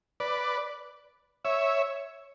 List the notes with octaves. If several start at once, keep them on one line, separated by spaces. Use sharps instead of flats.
B4 D5
C#5 E5